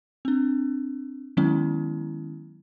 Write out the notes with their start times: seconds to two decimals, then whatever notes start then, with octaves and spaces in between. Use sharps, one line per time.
0.25 C4 D4
1.37 D#3 F#3 G#3 B3 C#4 E4